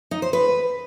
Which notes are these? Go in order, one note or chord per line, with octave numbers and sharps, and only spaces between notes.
D#4
C5
B4